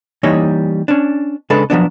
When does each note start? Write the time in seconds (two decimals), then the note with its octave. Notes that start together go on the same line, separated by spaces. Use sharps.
0.23 E3 G3 A#3 D#4 C#5 D#5
0.88 C#4 D4
1.50 C#3 G#3 D4 A4 B4
1.70 F3 F#3 B3 D4